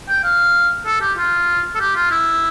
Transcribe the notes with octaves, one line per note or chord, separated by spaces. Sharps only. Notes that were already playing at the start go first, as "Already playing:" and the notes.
G5
F5
A4
G4
F4
A4
G4
F4
E4